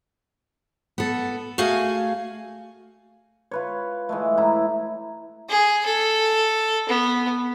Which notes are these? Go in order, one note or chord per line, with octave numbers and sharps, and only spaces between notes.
B3 A4
A3 F#4 G#4 F5 G#5
F4 B4 C#5
E3 G#3 A3
A2 E4 A#5
G#4
A4
B3